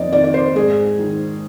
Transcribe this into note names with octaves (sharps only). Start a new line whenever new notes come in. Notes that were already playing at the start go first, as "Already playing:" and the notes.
Already playing: F2 D#3 D5 D#5
D#3 D5
D5
C5
G#2 G#4
D#3